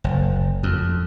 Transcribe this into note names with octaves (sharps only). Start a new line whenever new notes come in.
F#1
F2